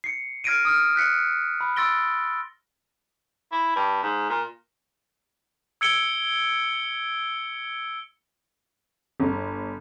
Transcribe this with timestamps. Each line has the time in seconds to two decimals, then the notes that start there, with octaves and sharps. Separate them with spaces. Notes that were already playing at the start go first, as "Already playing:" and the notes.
0.04 C7 C#7
0.44 F6 G#6 A#6 C7 D7 D#7
0.65 D#6 F6
0.96 F#6 B6 C#7
1.61 B5
1.76 C6 E6 A6 A#6 D7 G7
3.52 E4
3.76 G2
4.03 G#2
4.30 A#2
5.81 E6 G#6 C#7 D7 G7
9.20 G1